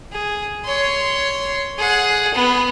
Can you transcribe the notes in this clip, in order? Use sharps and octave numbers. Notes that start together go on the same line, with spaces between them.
G#4
C#5 C6
G#4 F#5
B3 B4